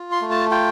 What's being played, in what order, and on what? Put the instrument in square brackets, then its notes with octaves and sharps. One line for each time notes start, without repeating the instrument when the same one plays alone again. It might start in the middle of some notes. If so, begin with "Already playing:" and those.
Already playing: [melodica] F4
C6
A3
A5
F4 G5